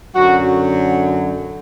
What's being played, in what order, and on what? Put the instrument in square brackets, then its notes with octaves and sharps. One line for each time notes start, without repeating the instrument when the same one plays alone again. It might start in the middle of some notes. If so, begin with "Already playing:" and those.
[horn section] F#2 D3 F#3 F#4